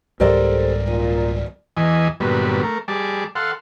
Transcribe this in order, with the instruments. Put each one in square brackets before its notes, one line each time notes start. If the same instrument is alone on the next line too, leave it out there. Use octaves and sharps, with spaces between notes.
[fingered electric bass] C2 G#2 G3 [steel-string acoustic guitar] G4 A4 C5 [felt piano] A#4 D5
[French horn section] A#2 [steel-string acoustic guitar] D#4
[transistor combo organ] E2 E3 D#5 G#5
G2 A#2 D3 F#3 G3 B3
A3 A#4
G3 G#4 A5 D6
A4 F5 F#5 C6